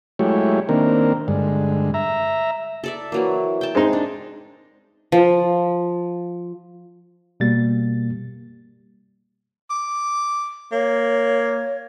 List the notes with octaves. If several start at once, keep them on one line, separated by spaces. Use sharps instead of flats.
F#3 G#3 A3 E4 G4 C#5
D#3 A#3 C4 D4 A#4
G2 D3 G#3
E5 A#5
A4 D5 E5
E3 F#3 A#3
G5 A5
G#3 C4 D#4
D4
F3
B2 G3 A#3 A6
D6
A#3 C#5